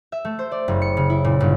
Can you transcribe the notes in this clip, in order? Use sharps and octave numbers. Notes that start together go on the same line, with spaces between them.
E5
A3
C5
D5
F#1
C#7
C#3
E4
A#2
G1